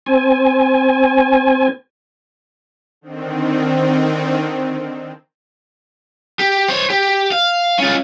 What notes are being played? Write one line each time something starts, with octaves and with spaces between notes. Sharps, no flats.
C4 G#5
D3 D#3 C4
G4
C5 C#5
G4
F5
C#4 F4